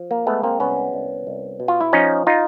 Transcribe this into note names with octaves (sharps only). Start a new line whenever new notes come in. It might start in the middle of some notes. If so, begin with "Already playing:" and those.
Already playing: F3
A#3
G#3 A3 B3
A#3 C4
C2 B3 C#4
C2
C2
B2
F4
E4
F3 C#4 D#4
D#4 F4